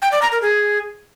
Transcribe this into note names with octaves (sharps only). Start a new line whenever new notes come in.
G5
D5
A#5
A#4
G#4